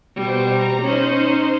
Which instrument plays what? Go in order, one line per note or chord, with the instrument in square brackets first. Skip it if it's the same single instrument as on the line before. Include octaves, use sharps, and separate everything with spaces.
[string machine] B2 C5 [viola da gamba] G3
[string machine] A#5
[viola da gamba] C#4 [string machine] D#4 C5